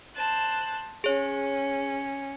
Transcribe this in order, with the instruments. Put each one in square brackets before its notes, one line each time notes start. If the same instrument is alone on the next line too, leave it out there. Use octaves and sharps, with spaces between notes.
[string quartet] C5 A5 F#6
[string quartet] C#4 [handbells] G#4 C#5